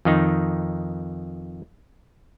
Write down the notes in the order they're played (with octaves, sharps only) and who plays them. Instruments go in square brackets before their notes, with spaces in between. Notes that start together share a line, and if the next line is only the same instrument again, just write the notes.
[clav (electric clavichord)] F2 D#3 D#4